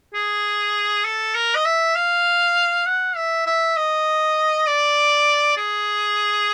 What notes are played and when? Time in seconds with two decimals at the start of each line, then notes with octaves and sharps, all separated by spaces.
0.14 G#4
1.05 A4
1.35 A#4
1.55 D#5
1.65 E5
1.96 F5
2.86 F#5
3.16 E5
3.46 E5
3.76 D#5
4.67 D5
5.57 G#4